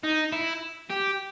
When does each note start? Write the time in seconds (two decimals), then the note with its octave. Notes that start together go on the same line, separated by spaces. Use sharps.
0.04 D#4
0.32 E4
0.90 G4